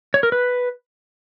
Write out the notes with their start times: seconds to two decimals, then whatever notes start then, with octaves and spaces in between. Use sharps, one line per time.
0.14 C#5
0.23 A#4
0.32 B4